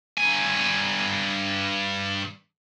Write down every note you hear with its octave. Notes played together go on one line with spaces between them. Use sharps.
G2 G#5